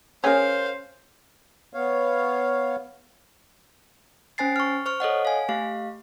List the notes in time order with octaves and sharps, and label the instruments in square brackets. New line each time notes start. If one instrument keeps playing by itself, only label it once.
[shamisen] C#4 G#4 [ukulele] A#4 C#5 [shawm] C5 [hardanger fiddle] F5
[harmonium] B3 C#5 F5
[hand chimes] C#4 C5 G#5 A6 C7
C#6 F6
C5 C#6 F6
A4 C#5 D#5 F#5
F5 G#5
A3 G4 F5